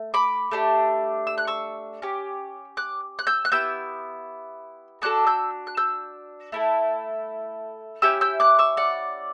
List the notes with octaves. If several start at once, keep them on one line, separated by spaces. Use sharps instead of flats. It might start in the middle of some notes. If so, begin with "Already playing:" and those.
Already playing: A3
B5 D6
A3 D4 G4
E6
F#6
C#6 E6
C#4 G4
D6 F#6
F#6
E6 G6
F#6
B3 E4 G4 E6 G6
B3 D4 F#4 A4 D6 F#6
E6 G6
F#6
E6 G6
A3 E4 A4
C#4 E4 G4 E6 G6
E6 G6
D6 F#6
C#6 E6
D5 F#5